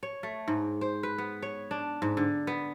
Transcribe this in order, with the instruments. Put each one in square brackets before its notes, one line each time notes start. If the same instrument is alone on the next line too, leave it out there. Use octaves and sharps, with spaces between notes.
[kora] C#5
A3
G#2
C5
B4
B3
C#5
D4
G#2
D3
B3